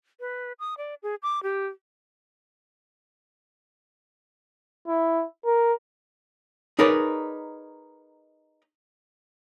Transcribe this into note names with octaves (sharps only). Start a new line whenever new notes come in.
B4
D#6
D5
G#4
D6
G4
E4
A#4
D#4 G#4 A#4 B4 C#5 D5